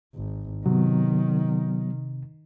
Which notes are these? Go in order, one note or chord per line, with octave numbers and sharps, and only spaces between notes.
G#1
C3 D#3 F#3 B3